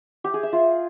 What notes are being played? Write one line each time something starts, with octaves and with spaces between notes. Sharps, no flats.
G4
G#4
E5
F4